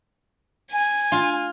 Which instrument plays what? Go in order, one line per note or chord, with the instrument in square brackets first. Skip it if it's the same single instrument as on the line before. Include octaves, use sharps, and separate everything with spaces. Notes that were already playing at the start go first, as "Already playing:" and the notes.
[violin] G#5
[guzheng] F4